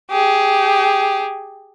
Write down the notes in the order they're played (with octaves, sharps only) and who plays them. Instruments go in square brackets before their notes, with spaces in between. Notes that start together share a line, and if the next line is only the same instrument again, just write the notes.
[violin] G4 G#4